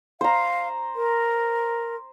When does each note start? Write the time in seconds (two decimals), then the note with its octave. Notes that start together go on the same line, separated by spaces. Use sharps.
0.21 C5 F5 A#5
0.96 A#4